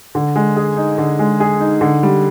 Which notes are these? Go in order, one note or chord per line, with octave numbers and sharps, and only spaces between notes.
D3
G#3
G#4
D#4
D3
G#3
G#4
D#4
D3
G3